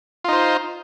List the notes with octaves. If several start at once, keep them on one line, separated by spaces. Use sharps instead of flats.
D#4 F4 C5